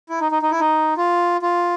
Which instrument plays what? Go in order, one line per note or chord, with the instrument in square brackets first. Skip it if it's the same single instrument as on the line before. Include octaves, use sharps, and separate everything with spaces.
[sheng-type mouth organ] E4
D#4
D#4
D#4
E4
D#4
F4
F4